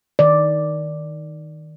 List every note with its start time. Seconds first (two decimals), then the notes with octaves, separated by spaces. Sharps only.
0.19 D#3 D5